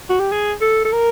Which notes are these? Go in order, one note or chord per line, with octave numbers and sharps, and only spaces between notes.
F#4
G4
G#4
A4
A4
A#4